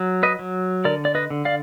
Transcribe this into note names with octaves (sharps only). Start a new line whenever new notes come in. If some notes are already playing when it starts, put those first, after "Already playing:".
Already playing: F#3
B4 D#5
F#3
D3 A#4 D5
D5
B4 D#5
D3
D5 F5